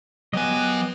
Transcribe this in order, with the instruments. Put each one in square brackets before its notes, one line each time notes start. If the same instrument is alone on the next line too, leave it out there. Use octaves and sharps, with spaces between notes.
[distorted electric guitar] F#3 G#5 [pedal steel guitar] B3 G4 D#5